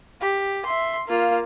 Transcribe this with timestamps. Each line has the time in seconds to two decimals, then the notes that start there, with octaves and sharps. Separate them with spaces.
0.21 G4
0.65 E5 C6
1.08 A#3 F4